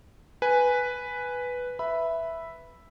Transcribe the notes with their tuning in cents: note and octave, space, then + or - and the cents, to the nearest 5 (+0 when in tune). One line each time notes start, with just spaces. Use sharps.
B4 +0 G#5 +0
B4 +0 E5 +0 B5 +0